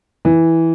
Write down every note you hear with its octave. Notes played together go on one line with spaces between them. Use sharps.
E3